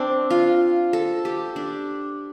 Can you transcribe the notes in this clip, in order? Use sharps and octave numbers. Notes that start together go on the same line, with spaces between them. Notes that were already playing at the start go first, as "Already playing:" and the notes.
Already playing: C4 D4
F4
A4
G4
D4